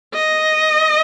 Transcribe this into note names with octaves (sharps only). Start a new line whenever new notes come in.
D#5